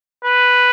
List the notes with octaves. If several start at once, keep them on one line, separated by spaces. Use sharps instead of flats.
B4